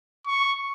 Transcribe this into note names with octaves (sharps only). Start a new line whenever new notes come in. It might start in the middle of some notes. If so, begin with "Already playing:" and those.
C#6